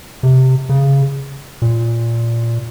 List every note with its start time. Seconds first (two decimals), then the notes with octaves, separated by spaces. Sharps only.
0.23 C3
0.69 C#3
1.62 A#2